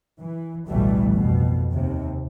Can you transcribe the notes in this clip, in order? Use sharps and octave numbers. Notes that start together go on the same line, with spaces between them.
E3
A1 D2 B2 E3 G3 A3
F2 B2
D#2 C3